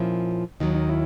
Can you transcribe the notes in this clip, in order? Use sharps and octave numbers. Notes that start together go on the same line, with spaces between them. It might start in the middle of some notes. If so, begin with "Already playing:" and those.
Already playing: A#2 F3 A#3 C#4 E4
D#2 D#3 F#3 D#4
D#4
E4